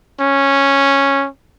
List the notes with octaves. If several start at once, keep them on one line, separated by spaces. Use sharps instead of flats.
C#4